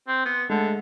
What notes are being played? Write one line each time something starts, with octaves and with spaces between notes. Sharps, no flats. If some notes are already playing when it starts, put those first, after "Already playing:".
C4
B3
D3 G#3 A3